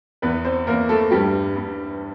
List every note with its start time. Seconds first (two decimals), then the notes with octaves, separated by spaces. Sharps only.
0.22 E2 B3 B4
0.45 C4 C5
0.67 E2 A#3 A#4
0.89 A3 A4
1.11 G2 G3 G4
1.56 G2